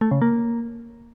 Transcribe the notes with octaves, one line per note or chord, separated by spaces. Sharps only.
A3
C#3
A#3